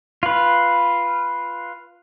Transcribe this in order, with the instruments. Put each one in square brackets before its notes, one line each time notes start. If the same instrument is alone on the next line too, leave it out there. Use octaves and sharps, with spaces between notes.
[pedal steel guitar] F4 B4